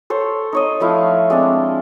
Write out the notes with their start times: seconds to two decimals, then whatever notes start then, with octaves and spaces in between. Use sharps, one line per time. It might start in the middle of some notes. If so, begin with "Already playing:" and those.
0.10 A4 C5 C#5
0.53 D#4 C#5 D#5
0.80 F3 A3 E4 F5
1.30 G#3 C4 D4 A5